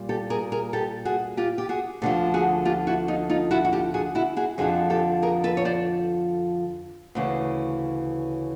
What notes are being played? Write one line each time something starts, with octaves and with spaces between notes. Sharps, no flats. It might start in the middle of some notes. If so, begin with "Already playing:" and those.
Already playing: A#2 G3
G4 A4
G#4 A#4
G#4 A#4
G4 A4
F#4 G#4
F4 G4
G4
F#4 G#4
D2 D3 F3 G4 A4
F#4 G#4
F4 G4
E4 F#4
D#4 F4
D#4 F4
E4 F#4
F#4
F4 G4
F#4 G#4
E4 F#4
F#4 G#4
F2 D3 F3 F#4 G#4
G4 A4
G#4 A#4
A4 B4
C#5
C5 D5
D2 C#3 E3